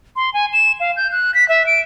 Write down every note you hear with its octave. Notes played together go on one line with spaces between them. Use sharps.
C6
G#5
E7
F5
G6
F#6
B6
E5
D7